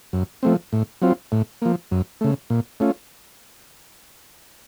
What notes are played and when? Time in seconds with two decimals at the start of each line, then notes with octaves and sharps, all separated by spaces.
0.13 F#2
0.43 F3 A3 C4
0.73 A2
1.02 F#3 C4 F4
1.32 A2
1.62 F3 A#3
1.91 F#2
2.21 C#3 A3
2.50 A#2
2.80 A3 C#4 F4